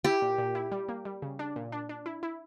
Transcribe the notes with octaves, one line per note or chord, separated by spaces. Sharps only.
E4 G4
A#2
A#2
E4
G3
A#3
G3
C#3
D4
A#2
D4
D4
E4
E4